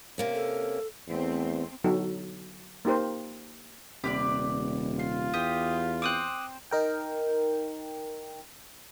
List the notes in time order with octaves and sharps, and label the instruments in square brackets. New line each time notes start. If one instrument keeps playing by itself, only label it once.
[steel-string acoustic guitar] C3 A#3 C#4
[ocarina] A4
[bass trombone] E2 [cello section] A3 C4
[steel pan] D3 F#3 B3 D#4 F#4 A4
A#3 D#4 G4 A#4 C5
[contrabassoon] D#1 [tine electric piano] C3 [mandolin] G4 B4 D5
[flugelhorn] F4 [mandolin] C6
[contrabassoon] E2 [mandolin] G4 [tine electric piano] D#6
[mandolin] C4 C5 G5 [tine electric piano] D6 D#6 F#6
[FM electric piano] D#4 A#4 G5